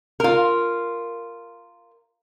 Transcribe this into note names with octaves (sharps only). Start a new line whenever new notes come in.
F4 A#4